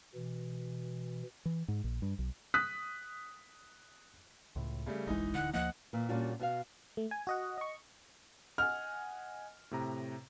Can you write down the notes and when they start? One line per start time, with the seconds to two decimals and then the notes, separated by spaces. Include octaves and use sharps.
0.15 B2 E3
1.45 E3
1.68 G#2
1.84 A#1
2.02 G2
2.19 B1
2.54 D#6 F#6 B6
4.56 C#2 A2
4.86 C#3 G3 A3
5.07 F#1 B1 E3 G#3 D#4
5.35 D1 A#1 D3 F#5
5.53 D2 F3 A#3 D#5 F#5
5.93 A#2 E3
6.09 A#2 G3 C#4 D4 F4 F#4
6.40 B2 F#4 F5
6.97 A3
7.11 G#5
7.27 F#4 D#5 F#5
7.58 D#5 C#6
8.58 D#5 F#5 G#5 F6
9.71 A2 C3 A#5